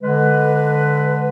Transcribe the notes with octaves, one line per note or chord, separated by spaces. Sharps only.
D3 G#3 B4